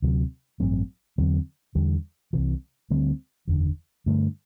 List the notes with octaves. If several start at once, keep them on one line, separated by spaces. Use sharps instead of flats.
D2 C3 F#3
A1 G2 F#3 C4
E2 D3 F#3 C4
E2 D3 G3
C2 C3 E3
D2 D3 G3 C4
F#1 E2 D3
G2 D3 A3